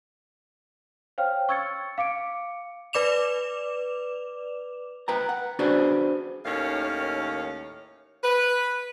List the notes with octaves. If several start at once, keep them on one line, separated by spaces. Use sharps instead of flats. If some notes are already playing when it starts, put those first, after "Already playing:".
C5 C#5 F5 G5 F6
C#6 E6 G#6 A6 C#7
F5 D6 C#7 D7
B4 D5 D6 E7 F7
B4 G5 A#5
F#5
D4 F#4 G#4 B4 C5 D5
D#2 A2 D#3 C#4 C#5 F5
B4